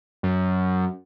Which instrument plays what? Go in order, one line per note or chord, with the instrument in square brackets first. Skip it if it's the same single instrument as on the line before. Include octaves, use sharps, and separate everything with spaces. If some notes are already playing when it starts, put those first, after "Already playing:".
[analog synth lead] F#2